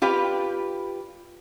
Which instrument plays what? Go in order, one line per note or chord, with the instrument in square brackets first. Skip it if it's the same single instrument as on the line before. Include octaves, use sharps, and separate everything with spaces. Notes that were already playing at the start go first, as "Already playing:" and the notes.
[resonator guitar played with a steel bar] F4 G4 B4 D5